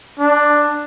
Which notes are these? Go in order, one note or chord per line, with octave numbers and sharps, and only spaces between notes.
D4